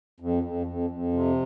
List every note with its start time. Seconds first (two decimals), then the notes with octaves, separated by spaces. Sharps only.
0.20 F2
0.43 F2
0.67 F2
0.90 F2
1.13 C3